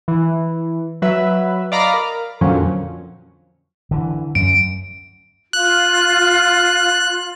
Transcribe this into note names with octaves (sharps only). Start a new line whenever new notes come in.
E3
F#3 B4 E5
D5 D#5 F5 A#5 B5 D6
A#4
F2 A#2 D3 F3 F#3 C#4
D3 E3
F#2 D7
F4 F#6